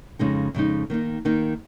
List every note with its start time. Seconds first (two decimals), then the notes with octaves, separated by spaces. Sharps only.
0.19 F2 C#3 G#3 D#4
0.54 F2 C#3 G#3 D#4
0.90 D#3 A#3 D#4
1.25 D#3 A#3 D#4